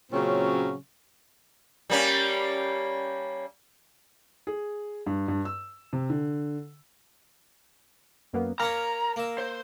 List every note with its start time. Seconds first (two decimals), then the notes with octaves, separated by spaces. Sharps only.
0.12 A#2 C#3 F#3 C4 C#4
1.90 G3 A#3 C#4
4.47 G#4
5.06 G2
5.28 G2
5.45 E6
5.93 C3
6.10 D3
8.33 F#2 A#3 B3
8.60 A#3 C#4 C#5 A#5 F6 A#6
9.16 A#3 E5
9.38 C5